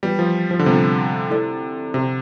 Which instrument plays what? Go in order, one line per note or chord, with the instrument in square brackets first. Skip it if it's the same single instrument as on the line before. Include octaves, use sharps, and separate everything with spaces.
[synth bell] E3 B3 F4 B4 D5 [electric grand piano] G3
[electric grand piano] F3
F3
D3
[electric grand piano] C3 [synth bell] G3 B3 F4 A4
[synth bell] A3 E4 A4 D5
[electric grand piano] C3 [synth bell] C4 G4 C5